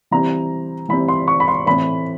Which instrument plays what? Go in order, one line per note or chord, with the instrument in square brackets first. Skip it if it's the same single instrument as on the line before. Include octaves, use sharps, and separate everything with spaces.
[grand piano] E3 G3 C4 A#5
E3 G3 C4 B5
C6
C#6
B5
C6
A2 E3 A3 C4 B5